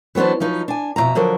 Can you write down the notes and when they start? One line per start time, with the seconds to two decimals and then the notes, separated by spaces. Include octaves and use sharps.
0.15 E3 F#3 B3 D4 C5
0.40 F3 F#3 D#4 B4
0.68 D4 G#5
0.96 F2 B2 D#3 E5 A#5
1.15 D3 F3 F#3 A#4